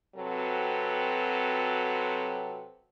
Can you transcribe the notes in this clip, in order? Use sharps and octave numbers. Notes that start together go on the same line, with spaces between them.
C3 F#3 C4 F#4 A4 B4